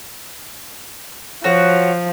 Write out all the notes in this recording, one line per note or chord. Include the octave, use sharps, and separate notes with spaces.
F3 F#4 C#5